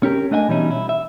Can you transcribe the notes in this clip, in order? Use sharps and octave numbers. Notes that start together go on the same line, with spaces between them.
C#4 G4 A#4
A3 D4 D#5 F#5 G#5
B2 E3 G3 C#4 D#4 E4
E4
E5